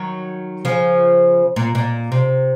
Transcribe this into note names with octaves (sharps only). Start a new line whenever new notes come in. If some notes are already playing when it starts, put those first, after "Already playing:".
Already playing: D#3 F#3
C#3 F3
A#2
A#2
C3